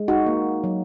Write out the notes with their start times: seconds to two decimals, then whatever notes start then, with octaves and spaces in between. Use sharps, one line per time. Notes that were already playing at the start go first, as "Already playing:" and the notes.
Already playing: G#3
0.08 D#4 F#4
0.26 A#3
0.64 F#3